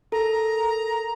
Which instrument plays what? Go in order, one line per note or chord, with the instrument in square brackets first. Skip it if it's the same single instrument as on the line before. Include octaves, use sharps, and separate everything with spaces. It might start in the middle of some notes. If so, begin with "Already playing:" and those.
[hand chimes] A4 A#4 [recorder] A#5